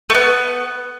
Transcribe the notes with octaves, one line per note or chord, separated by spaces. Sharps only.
A3
B3